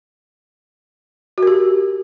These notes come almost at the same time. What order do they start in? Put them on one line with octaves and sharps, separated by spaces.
F#4 A#4 G4